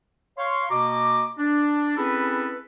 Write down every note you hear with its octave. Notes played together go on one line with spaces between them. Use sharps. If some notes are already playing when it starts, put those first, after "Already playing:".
C#5 F5 C6 C#6
B2 A#3 F#4 D#5 A#5 D6
D4
C4 C#4 E4 G#4 A4 B4